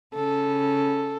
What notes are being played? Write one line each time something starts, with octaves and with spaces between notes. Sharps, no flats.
C#3 A4